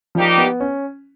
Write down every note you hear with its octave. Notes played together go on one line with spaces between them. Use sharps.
F3 G3 A#3 D#4 G4
B3
C#4